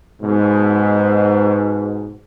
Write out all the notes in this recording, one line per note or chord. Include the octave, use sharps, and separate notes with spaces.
G#2 B2